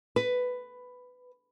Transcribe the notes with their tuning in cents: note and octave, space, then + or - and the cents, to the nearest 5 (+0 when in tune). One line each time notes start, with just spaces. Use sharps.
B4 +10